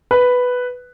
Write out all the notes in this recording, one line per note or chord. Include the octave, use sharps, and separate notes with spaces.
B4